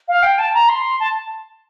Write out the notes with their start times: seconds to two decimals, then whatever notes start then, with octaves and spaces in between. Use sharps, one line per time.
0.08 F5
0.23 G5
0.39 A5
0.54 A#5
0.69 C6
1.00 A5